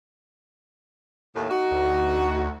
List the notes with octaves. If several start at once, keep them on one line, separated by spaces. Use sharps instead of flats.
D#2 A2
D#4 F#4
D2